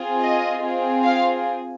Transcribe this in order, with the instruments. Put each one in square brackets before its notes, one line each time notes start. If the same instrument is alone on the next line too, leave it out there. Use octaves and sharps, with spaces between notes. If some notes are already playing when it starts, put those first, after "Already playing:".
Already playing: [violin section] C4 F4 G#4
D#5
C4 F4 G#4
F5